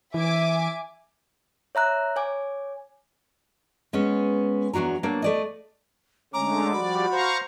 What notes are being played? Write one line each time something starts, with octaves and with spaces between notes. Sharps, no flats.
E3 E5 G#5 D6
C#5 E5 A#5 F#6
C#5 G#5 D6
G#3 B3 C#4
E2 F#3 D4 F#4 A#5
F#3 A#3 D4
A3 D5 D#5
D3 G#3 A3 C#4 A#5 D6
F3 G3 F#4 D5 B5
C5 F5 A#5 C#6